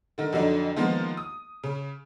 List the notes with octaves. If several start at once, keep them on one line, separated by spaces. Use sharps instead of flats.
D3 D#3
F2 D3 F#3 D4 D#4
D#3 F3 G#3 A#3 B3
D#6
C#3